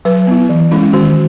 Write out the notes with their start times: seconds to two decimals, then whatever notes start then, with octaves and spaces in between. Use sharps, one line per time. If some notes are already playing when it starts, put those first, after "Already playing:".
0.05 F#3 B4
0.27 B3 E4
0.49 E3
0.71 G#3 C#4 E4
0.93 D#3 F#4